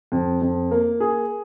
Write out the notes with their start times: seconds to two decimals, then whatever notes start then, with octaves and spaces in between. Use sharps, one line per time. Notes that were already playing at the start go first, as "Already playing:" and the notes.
0.12 F2
0.42 F2
0.71 A#3
1.00 G#4